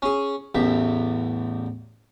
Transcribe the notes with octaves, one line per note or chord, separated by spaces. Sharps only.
C#4 G#4
A1 E2 E5